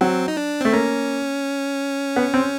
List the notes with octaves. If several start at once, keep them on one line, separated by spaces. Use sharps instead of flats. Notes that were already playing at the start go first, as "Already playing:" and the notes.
F#3 C4
D#4
D4
A3 C4
A#3 C#4
B3
C4